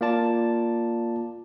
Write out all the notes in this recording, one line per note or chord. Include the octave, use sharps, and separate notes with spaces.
A#3 F4 D5 A5